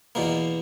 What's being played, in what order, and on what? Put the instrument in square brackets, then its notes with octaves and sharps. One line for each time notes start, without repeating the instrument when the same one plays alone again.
[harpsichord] E2 B2 A#3